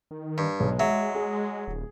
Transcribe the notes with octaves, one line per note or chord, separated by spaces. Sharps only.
D#3
G2
B1 G#3
F#3 E5
G#4
D#1